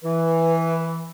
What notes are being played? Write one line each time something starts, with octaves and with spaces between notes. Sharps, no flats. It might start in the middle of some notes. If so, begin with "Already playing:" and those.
E3 B4